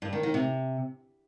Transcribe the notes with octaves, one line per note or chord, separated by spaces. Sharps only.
G2
D#3
D#3
C3